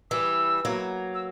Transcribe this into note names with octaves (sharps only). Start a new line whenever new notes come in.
E3 G3 E6
F#3 A#3
E6